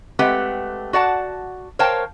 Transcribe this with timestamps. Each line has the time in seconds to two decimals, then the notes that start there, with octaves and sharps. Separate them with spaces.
0.19 G#3 A3 C4 G4 B4 F#5
0.93 F#4 D5 F#5 A5
1.79 A#4 C5 C#5 F5 G5 A5